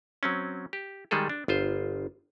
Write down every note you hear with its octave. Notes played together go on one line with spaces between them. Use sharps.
F#3 C4 C#4
G4
D#3 G3 G#3 G#4 A4
D4
G1 F4 C5